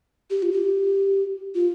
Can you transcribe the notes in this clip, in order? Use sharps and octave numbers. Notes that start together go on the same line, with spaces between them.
G4
F4
G4
F4